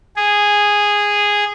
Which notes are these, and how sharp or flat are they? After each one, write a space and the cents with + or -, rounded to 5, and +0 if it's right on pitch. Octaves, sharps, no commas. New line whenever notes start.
G#4 -10